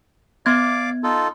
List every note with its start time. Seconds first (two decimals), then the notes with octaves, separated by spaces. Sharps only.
0.46 B3 D5 F5 D6 G#6
1.03 D#4 F4 A4